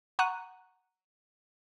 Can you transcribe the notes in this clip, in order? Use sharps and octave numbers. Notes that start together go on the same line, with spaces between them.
F#5 A#5 C#6 F#6 D#7